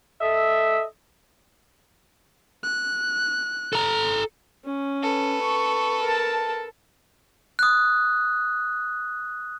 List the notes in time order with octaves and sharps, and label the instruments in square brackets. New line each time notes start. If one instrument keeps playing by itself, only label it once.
[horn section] A4 D#5 E5
[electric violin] F#6
[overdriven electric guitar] A4 A#5
[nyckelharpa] C#4
[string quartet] A4 B4
[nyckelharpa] C#6
A#4 A5
[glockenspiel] D#6 F#6